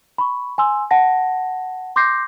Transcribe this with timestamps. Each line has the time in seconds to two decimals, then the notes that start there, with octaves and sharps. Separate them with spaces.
0.18 B5 C#6
0.58 G#5 C6 E6
0.91 F#5 A5 A#6
1.96 C6 D6 G6 A#6 C7